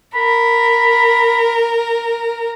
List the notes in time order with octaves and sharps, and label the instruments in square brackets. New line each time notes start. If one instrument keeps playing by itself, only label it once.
[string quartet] A#4 [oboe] B5